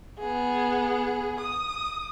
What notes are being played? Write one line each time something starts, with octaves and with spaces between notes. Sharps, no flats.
B3 G#4
D#6